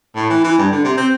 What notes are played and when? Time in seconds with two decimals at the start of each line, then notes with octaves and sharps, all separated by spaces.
0.15 A2
0.30 E3
0.44 E3
0.58 G2
0.71 D3
0.84 C3
0.97 C4